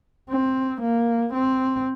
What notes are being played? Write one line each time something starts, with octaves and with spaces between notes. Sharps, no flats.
C4
A#3
C4